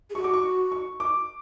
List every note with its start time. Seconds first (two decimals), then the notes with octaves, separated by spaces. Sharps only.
0.10 G#4
0.15 F#4 C#6
0.24 D6
0.34 C#6
0.72 C#6
1.00 D6